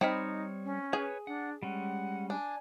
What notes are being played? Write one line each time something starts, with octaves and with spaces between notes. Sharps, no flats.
G3 C4 D#4 C#5 D#5 B5 F6
C#4
G#4 B4 C#5
D4 F#5
G3 G#3 C#4 F#5
D4 G#5